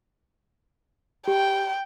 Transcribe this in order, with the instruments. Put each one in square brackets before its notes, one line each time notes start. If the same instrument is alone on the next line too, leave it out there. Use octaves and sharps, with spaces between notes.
[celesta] G4 [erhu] G5